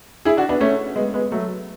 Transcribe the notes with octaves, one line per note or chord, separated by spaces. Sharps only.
E4 G#4
D4 F#4
B3 D4
A3 C#4
G#3 B3
G#3 B3
F#3 A3